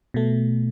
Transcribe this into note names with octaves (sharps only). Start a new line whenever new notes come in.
B2 A3